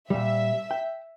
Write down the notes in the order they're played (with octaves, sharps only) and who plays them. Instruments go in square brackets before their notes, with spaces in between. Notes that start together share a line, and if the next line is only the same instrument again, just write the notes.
[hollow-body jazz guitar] A#2 G3 [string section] E5
[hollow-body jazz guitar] G5